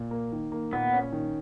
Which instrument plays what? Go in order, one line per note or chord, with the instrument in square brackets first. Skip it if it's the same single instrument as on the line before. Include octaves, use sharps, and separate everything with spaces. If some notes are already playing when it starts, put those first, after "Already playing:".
Already playing: [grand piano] A#2
A#3
D#3
A#3
[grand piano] A#2 [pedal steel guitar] B3
[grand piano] C#4
D#3